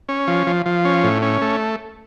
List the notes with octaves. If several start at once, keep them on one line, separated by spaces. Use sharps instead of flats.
C#4
F3
F3
F3
C#4
A2
C#4
A3